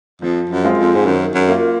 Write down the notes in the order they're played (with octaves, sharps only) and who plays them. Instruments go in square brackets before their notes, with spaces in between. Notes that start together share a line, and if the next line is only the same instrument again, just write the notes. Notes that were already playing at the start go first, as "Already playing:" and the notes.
[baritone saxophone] F2 [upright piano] F3
[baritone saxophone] F#2
[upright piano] G#3 C4 F4
[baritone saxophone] F2
G#2
[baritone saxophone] F#2 [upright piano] D#3
[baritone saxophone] F#2
[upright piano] A#3 F4